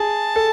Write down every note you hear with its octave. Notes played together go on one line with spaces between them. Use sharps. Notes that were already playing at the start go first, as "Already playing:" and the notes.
Already playing: G#4 A5
A4